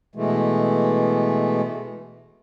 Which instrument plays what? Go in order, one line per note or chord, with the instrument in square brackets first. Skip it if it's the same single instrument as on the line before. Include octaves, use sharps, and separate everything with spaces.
[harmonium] B2 E3 G#3 A3